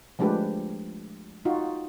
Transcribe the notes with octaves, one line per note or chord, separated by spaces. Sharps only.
F3 G#3 A3 D4 G4 B4
D#4 F4 F#4